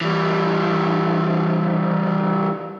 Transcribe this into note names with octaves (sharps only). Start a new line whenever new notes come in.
E3 G3